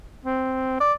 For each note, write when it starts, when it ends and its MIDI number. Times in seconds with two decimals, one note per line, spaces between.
0.25 0.79 60
0.80 0.93 74